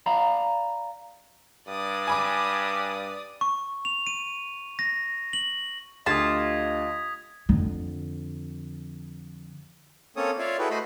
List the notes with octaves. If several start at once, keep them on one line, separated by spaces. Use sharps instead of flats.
D5 F5 A#5 B5
G2 D5 D#6
G#5 B5 D6
C#6
F7
D#7
A#6
F#7
D2 F4 G4 D#5 A5 D#6 G#6 B6
F2 D3
A#3 C4 C#4 A4 C#5 D#6
F4 C#5 D5 E5 F5
E4 F#4 G#4 A4 B4 G5
A3 F#4 C5 D#5 B5 C6